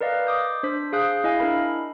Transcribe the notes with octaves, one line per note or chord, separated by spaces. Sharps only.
A#4 B4 D5 D#5 F5
D6 D#6 G6
D4 C5 B6
G#4 F5 D#6 F#6 G6
E4 D#5 F5 G#5
D4 E4 A#4 B5